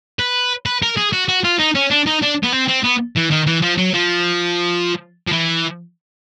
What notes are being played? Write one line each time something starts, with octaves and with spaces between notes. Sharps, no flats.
B4
B4
A#4
G#4
F#4
F#4
F4
D#4
C#4
D4
D#4
D4
B3
C4
C4
B3
E3
D#3
E3
F3
F#3
F3
F3
E3